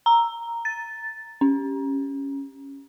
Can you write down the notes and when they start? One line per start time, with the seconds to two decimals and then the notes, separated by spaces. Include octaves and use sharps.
0.06 A#5
0.65 A6
1.41 C#4